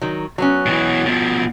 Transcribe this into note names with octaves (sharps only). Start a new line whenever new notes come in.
D#3 F#3
F#3 B3 C#4
B2 E3
B2 F3